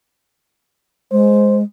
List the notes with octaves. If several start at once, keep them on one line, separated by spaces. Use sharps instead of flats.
G#3 C5